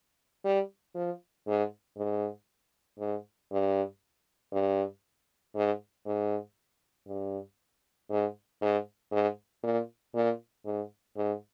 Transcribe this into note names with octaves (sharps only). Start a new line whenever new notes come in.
G3
F3
G#2
G#2
G#2
G2
G2
G#2
G#2
G2
G#2
G#2
G#2
A#2
A#2
G#2
G#2